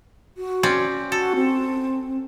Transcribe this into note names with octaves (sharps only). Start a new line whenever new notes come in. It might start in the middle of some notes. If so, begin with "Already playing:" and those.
F#4
C4 C#4 D5
F#4 A4
C4